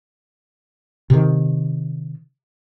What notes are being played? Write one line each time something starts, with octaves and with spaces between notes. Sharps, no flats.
C3 D#3